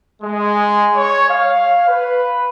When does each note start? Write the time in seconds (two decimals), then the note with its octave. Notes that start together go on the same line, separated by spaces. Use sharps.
0.23 G#3
0.96 C#5
1.29 F5
1.88 B4